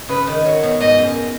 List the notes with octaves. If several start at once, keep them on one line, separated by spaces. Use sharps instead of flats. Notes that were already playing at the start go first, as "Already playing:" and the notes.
Already playing: G#2
C#3 B4
D#3
F#3 C#5
B2
G#2 D#5
F#2